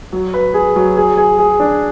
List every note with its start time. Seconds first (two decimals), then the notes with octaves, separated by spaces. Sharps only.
0.13 F#3
0.34 B4
0.54 G#4
0.76 F#3
0.97 G#4
1.17 G#4
1.39 G#4
1.60 D4